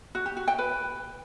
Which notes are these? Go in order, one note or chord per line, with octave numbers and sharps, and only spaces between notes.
F#4
G4
F#4
G5
B4